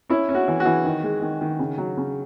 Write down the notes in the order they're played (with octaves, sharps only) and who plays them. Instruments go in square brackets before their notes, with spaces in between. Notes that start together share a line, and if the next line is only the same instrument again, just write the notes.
[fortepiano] C#4 E4
C#4
F#4
E3
F#4
E3
D#3
G#3
D#3
D#3
C#3
F#3
C#3